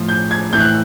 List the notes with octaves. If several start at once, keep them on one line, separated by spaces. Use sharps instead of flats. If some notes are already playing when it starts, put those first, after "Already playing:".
Already playing: A2 F3
G6
G#6
A2 E3 G6
F#6